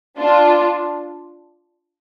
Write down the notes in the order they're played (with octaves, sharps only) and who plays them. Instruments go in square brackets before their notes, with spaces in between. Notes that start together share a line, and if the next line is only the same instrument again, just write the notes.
[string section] D4 F4